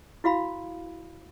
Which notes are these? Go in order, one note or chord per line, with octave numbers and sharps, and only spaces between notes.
E4 F#4 F5 B5